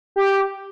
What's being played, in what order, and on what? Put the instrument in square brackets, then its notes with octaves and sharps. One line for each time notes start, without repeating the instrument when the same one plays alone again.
[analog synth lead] G4